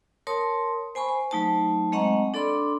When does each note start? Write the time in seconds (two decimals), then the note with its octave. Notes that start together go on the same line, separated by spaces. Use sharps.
0.27 A#4 C#5 A5 C6 D#6
0.95 C5 G#5 B5 C#6
1.09 C5
1.31 F#3 A3 D#4 C5 A5
1.92 G#3 C4 D#5 F#5 A#5 C#6
2.34 D4 A4 D5 B5 C6 D6